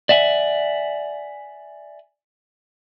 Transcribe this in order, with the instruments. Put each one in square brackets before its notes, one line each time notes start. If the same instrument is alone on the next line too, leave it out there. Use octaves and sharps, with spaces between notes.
[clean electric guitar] D5 E5 F#5 G#5